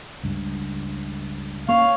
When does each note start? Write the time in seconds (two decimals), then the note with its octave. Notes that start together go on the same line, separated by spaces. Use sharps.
0.24 C#2 G2
1.69 A#3 C#4 C#5 F5